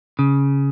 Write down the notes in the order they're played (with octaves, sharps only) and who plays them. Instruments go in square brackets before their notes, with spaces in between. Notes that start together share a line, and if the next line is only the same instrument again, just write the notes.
[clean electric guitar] C#3